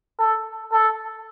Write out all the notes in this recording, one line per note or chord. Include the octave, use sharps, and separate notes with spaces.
A4
A4